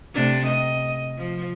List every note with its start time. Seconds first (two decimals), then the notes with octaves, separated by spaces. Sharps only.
0.14 C3 A3 D4
0.47 D#5
1.18 F3